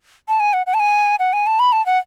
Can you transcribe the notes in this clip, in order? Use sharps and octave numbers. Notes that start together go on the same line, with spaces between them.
A5
G#5
F#5
F#5
A5
G#5
F#5
G#5
A5
B5
A5
F#5